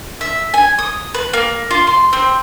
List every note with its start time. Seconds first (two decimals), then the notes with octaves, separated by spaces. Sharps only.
0.21 E5
0.54 G#5
0.79 D#6
1.14 B4
1.33 A#3
1.71 F4
1.87 C6
2.13 C4